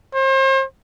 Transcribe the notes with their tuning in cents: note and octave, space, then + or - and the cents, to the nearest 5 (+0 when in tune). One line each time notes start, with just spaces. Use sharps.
C5 +40